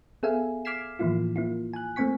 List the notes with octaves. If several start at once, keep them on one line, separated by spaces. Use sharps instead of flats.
B3 G#4 A4 E5 F5 G#5
D6 F6 G#6 B6 C7 E7
A2 E3 F3 A#3 E4 F4
A#3 E4 F4
G#5 F#6
A3 A#3 C4 G#5 C#6 B6